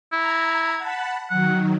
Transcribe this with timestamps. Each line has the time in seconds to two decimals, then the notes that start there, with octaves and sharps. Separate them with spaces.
0.12 E4 A#5 G#6
0.78 F#5 A5 B5
1.30 D#3 F#3 F#5